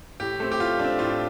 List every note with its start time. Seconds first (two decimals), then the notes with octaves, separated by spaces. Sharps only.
0.20 A2 G4
0.40 A3 C4
0.52 G4
0.60 A2 F4
0.79 A3 C4 D4
0.99 A2 F4